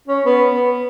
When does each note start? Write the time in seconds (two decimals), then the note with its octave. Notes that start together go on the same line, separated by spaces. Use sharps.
0.08 C#4
0.26 B3
0.51 B3